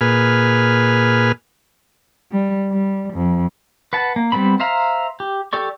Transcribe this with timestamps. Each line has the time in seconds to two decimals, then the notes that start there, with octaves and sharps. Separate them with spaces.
0.01 A#2 G#4 B4 F6
2.32 G3
2.71 G3
3.14 F2
3.93 B4 F#5 A5
4.16 A#3
4.32 G3 A3 B3 C4 B5
4.60 C5 E5 F5 A#5
5.20 G4
5.53 G4 A4 D5 C#6